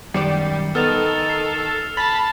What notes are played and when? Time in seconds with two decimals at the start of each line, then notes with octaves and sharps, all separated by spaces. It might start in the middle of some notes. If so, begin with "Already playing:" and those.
0.14 F#2 D#3 G3 D5 C7 C#7
0.75 D#3 B3 A4 F6 A6 F7
1.30 C7
1.97 A5 B5 A6